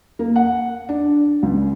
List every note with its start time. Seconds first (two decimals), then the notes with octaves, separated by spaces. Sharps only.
0.19 A#3
0.36 F#5
0.89 D4
1.43 C#2